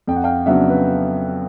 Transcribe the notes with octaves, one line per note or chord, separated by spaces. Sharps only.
F2 G5
F#5
F5 G5
C#3 F#3 B3 D4 E5 F#5
B4